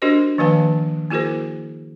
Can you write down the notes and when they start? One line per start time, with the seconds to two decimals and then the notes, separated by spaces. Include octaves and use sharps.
0.02 D4 F#4 G4 A#4 C5 D#5
0.38 D#3 F3 A#3 B4 F5 A5
1.10 A#3 E4 F#4 G#4 A#4 C5